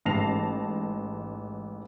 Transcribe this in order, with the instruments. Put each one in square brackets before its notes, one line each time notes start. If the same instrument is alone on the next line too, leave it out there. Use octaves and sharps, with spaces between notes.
[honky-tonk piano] A1 G#2 A5 A#6 C7 F7